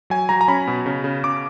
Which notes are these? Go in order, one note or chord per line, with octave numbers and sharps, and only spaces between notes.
F#3 G#5
F#3 A#5
A#5
C#4 B5
B2
C#3
C#3
C#3 D6